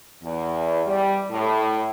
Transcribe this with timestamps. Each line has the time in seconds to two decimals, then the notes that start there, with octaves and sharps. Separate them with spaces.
0.23 E2
0.86 G3
1.30 A2